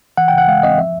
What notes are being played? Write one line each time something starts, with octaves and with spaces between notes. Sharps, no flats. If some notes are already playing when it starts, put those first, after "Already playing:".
E3 F#5
G5
C#3 F#5
G#3 F5
C4 D#5
F3 E5